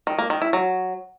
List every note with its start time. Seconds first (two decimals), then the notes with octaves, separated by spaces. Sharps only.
0.07 D#3
0.18 A#3
0.30 D#3
0.42 E4
0.53 F#3